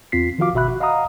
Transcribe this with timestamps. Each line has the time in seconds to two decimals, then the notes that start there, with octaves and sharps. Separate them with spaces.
0.12 E2 C4 F4 B6 C7
0.38 D#3 F3 F4 F#4 F5 D6
0.53 G1 B2 F#4 E5 B5 F#6
0.68 F#4
0.80 D#5 F5 F#5 A#5 D#6